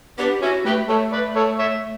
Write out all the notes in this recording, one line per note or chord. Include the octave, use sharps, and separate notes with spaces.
B3 D4 G4
C#4 E4 F#4
A3 G4 B4
A3 A4 C#5
B4 D5
A4 C#5
C#5 E5